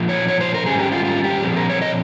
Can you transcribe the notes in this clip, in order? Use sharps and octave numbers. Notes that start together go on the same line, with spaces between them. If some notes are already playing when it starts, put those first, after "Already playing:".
Already playing: A#2 F3 D#4
C#5
C#5
C5
A#4
G#2 D#3 G3 C#4 G#4
G4
F4
F4
G4
A#2 F3 C4 G#4
A#4
C#5
D#5